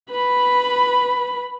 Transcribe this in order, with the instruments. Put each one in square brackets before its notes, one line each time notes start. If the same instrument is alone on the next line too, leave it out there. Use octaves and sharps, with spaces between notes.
[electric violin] B4 B5